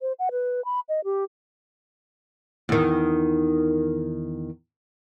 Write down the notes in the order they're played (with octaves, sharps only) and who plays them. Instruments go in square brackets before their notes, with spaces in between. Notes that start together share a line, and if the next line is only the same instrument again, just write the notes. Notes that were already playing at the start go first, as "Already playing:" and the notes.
[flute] C5
F#5
B4
B5
D#5
G4
[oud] E2 D#3